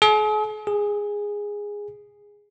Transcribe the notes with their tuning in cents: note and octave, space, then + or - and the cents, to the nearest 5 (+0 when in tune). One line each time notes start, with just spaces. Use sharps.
G#4 +45
G#4 -10